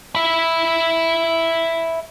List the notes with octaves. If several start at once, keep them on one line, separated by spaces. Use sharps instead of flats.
E5 B5